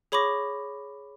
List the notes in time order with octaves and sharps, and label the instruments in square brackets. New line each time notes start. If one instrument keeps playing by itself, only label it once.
[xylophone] G#4 C#5 B5 C#6 D6 A#6